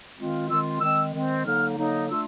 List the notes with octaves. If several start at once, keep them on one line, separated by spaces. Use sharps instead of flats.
D#3 G#3 C4 F4
D#3 G#3 C4 F4 E6
D#3 G#3 C4 E6
D#3 G#3 C4
D3 F#3 A#3 D#4 F6
D3 F#3 A#3 D#4
A3 D4 F4 E6